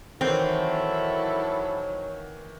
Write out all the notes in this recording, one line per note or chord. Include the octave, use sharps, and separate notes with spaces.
D#3 E3 F#3 C4 E4 A4